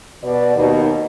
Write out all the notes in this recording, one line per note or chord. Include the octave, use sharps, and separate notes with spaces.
B2 D5
D#2 B2 D#4